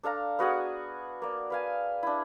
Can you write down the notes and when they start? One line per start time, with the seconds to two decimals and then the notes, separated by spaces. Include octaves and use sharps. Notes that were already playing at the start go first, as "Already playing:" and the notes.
0.03 D4 A4 F5 A#5
0.39 B3 F#4 G#4 F#5
1.22 A#3 D5
1.50 B4 F5 G#5
2.03 D4 E4